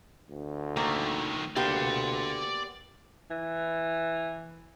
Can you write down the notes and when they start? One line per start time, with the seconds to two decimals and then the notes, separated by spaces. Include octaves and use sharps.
0.29 D2
0.77 D#3 A3 A#3
1.56 D2 A#3 B3 G4 D5 C6
3.30 E3